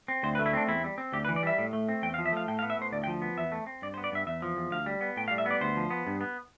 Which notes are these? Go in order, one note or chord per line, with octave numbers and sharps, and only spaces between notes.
C4
D2 C5
B4
A3
E4
C4 D4
E2 E4
G3
C4
D2 G4
B4
E3
D5
G3 E5
A2
A3
C4
E2 G5
F5
F3
E5
A3 F5
A2 G5
F5
B3
E5
A2 C5
D2 D5
G5
F3
B3
E2 E5
A3
C4
G2 D5
C5
B3
D5
G2 E5
E2 E5
F3
E2
D2 F5
G3
B3
A2 G5
F5
G3
E5
B3 D5
D2 C5
F3
B3
G2
B3